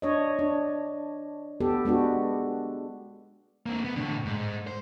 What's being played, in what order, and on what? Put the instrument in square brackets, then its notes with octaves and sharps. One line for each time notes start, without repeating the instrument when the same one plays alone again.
[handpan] D4 C#5 D#5
D4
B3 G4 A4
G#3 B3 D4 F#4
[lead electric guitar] A#3 C4
B3
A2 D3
G#2
C5